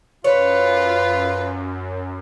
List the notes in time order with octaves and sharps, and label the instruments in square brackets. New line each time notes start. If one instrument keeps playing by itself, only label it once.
[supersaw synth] F#2 [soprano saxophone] F4 [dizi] B4 [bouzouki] C#5